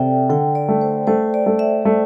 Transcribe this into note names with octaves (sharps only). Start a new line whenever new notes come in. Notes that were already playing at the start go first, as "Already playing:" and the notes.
Already playing: C3 A4 D5 E5 G5
D3 G5
D5
A3
C5
A3 C5
D5
A3
E5
A3